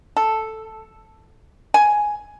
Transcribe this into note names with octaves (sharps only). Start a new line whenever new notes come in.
A4
G#5